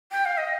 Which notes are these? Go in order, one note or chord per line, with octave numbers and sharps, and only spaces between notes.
G5
F5
D#5